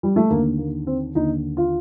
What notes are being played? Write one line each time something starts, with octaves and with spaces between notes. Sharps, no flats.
G3
A3
D#2 D3 A#3
A#3
C4
D#2 D3 D#4
F4